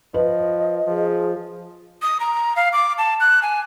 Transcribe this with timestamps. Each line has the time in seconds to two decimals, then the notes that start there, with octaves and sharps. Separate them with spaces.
0.14 F3 B4 D#5
0.87 F3 G#4
2.02 D#6
2.20 A#5
2.56 F5
2.73 D6
2.98 A5
3.20 F#6
3.42 G#5